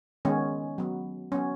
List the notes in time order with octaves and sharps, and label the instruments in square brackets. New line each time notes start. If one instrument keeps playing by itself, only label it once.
[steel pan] D#3 G#3 B3 C#4
F#3 B3
F#3 B3 C#4